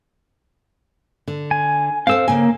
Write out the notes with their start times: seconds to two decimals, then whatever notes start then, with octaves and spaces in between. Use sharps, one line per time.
1.28 D3
1.51 G#5
2.07 C4 A4 C5 F5 E6
2.28 C#3 A#3 G#5